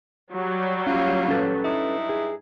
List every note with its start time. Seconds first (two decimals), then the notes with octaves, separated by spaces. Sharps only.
0.32 F#3 G3
0.87 A#3 C#4 F4
1.28 C#4 A4 B4
1.65 G2 D#4 E4
2.09 G#4